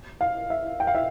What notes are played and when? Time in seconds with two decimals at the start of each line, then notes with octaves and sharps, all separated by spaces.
0.21 F5
0.50 E5
0.80 G5
0.87 F5
0.95 E5